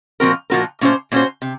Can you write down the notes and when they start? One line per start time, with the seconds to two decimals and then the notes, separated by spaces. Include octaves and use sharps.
0.20 A#2 F3 C4 F#4 A#4
0.50 A#2 F3 C4 F#4 A#4
0.81 A#2 A3 C#4 F#4 C5
1.12 A#2 A3 C#4 F#4 C5
1.42 C3